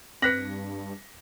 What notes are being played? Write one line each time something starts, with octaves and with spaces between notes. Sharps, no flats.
G2 C4 B4 F#6 A#6 B6 C#7 F#7